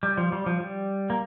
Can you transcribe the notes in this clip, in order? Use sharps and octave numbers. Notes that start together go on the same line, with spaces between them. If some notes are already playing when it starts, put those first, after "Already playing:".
G3
F3
G3
F3
G3
A#3